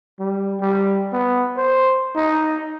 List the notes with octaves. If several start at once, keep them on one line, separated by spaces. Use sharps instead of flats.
G3
G3
B3
C5
D#4